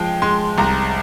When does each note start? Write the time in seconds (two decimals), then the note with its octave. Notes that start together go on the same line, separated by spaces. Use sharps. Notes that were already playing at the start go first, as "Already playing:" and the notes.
Already playing: F3 G#3 G5
0.22 G#3 C6
0.58 C2 A#5